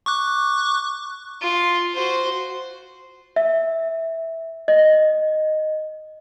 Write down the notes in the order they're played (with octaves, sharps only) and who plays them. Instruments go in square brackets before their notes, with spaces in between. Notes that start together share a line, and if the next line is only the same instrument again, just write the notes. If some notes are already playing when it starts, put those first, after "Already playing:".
[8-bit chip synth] C#6 D6 F#6
[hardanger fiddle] F4
F#4 C5
[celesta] E5
D#5